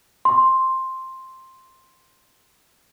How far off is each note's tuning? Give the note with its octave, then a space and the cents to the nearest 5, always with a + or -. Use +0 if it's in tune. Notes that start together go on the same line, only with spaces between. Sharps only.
C6 +5